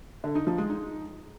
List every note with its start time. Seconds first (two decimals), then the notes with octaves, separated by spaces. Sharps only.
0.24 D3
0.35 D#4
0.47 F3
0.58 G#3
0.70 D#4